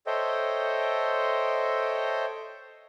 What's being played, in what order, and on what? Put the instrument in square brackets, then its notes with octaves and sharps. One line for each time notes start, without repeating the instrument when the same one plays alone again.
[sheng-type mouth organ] A4 C5 C#5 D#5 E5 G5